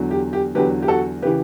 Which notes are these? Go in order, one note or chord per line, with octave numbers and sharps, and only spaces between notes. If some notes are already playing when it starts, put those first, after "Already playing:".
Already playing: E2 D3 F#3
G4
G4
E2 D3 F#3 G4 B4
G4
F#4 A4
C#3 E3 G4 B4